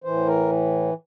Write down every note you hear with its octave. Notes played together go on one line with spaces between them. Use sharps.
A2 E3 C5
A#4